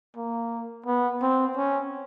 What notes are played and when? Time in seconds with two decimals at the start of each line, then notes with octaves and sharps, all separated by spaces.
0.16 A#3
0.86 B3
1.22 C4
1.56 C#4